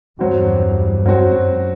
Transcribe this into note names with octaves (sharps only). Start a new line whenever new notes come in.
E2 G2 F#3 C4 F#4
F#2 F#3 C4 F#4